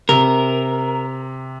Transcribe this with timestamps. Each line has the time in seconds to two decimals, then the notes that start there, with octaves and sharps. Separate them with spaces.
0.09 C3 A#4